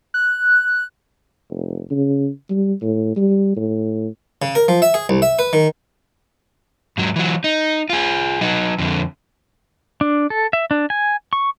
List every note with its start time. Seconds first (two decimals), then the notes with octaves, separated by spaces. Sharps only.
0.14 F#6
1.50 F1
1.91 C#3
2.51 G3
2.82 A2
3.17 G3
3.56 A2
4.42 C#3
4.55 A#4
4.68 F3
4.82 E5
4.94 G#4
5.09 C2
5.22 E5
5.39 B4
5.53 D#3
6.98 G#2 F#3
7.16 E3 F#3
7.44 D#4
7.90 F4 G#4
8.41 F#3 D#4
8.79 F2 D3
10.01 D4
10.30 A4
10.53 E5
10.71 D4
10.90 G#5
11.33 C#6